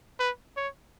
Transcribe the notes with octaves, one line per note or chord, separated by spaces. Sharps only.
B4
C#5